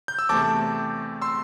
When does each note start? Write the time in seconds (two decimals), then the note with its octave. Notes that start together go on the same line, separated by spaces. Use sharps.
0.08 G6
0.19 E6
0.29 E2 C3 A3 C4 A5 D6
1.22 C6 E6